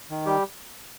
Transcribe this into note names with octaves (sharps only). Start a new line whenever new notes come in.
D#3
G3 G4